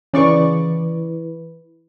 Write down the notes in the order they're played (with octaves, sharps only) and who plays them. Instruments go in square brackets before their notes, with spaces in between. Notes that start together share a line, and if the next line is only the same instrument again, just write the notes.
[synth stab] C#3 D5 C#6 [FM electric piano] E3 E4 B4